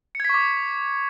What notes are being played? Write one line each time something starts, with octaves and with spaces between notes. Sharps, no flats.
C#6 D6 G#6 B6 C#7